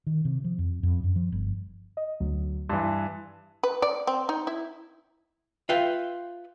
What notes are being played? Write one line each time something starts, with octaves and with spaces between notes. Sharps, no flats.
D#3
C3
F3
F2
F2
F#2
F3
G1
D#5
D2 F#3
G2 E3 C6
B4
D5
C4
D#4
E4
F4 B4 E5 F5 G5